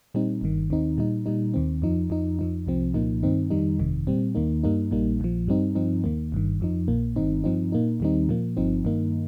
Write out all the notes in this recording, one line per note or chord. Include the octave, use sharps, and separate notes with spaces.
A#2 G3 C4 D#4
G1 G2 D#3
D#2 D#3 C4 D#4
A#2 G3 D#4
A#2 G3 D#4
D#2 D#3 C4
F2 F3 D#4
F2 F3 D#4
F2 F3 D#4
C2 C3 F3 C4
C2 A#2 F3 A#3 D#4
G2 D#3 C4 D#4
F2 D#3 G3 D#4
G1 F2 C3 D#3
A#2 G3 C4
D#2 D#3 A#3 D#4
G2 G3 A#3 D#4
A#1 A#2 G3 A#3 D#4
A#1 A#2 F3
G2 G3 C4 D#4
G2 F3 C4 D#4
D#2 D#3 A#3
G1 G2 D#3
F2 F3 D#4
A#1 A#2 A#3
G1 G2 D#3 C4 D#4
G2 F3 C4 D#4
A#2 A#3 D#4
D#2 D#3 G3 C4 D#4
A#2 F3 A#3
G1 G2 F3 C4 D#4
G2 D#3 A#3 D#4